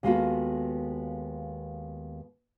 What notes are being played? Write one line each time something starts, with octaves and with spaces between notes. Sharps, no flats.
D#2 G#3 B3 F4 F#4 A4